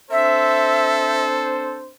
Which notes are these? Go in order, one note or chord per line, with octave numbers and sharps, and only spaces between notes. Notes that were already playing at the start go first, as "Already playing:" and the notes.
C4 D4 A4 C5 E5